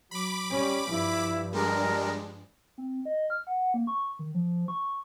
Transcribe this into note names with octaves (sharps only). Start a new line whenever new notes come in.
F#3 B5 D6
G3 C#4
G2 F3 E4
G3 G#3 D4 A#4
C4
D#5
F6
F#5
A#3
C#6
D#3
F3
C#6